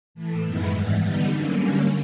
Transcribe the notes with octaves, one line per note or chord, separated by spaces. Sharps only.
A2 E3 A3
F#2 D#3 G#3 B3 E4
G#2 E3 G3
D3 G3 B3 D#4
D3 F#3 A#3 C#4
D3 G3 A#3 C#4